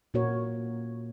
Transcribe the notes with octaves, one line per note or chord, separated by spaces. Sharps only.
A#2 A#3 F#4 A#4 C#5